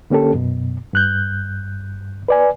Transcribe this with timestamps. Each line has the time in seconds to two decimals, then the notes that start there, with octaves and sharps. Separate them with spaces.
0.10 D3 A#3 C#4 G4 A4
0.33 F#2 B2
0.93 G2 F#6 G6
2.28 B4 D5 G#5